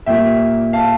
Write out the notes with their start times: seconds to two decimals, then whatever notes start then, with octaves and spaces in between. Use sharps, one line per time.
0.06 A#2 G3 A#3 E5 G5
0.73 F5 A5